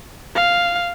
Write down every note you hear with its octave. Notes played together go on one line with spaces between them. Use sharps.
F5